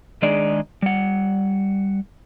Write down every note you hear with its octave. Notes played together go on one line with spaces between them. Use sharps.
D#3 G#3 D4 D#4 G#4 D5
G3 F#5